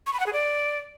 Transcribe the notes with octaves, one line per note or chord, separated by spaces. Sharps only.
C#6
B5
F#5
G#4
D5